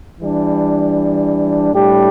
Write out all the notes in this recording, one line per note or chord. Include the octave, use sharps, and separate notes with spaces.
E3 G3 D4
A2 G3 D4 G4